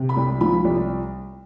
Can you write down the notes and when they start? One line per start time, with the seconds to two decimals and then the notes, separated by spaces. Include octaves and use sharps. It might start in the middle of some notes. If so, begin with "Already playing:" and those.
Already playing: C3
0.09 B5
0.17 C2
0.41 F3 B5
0.65 C2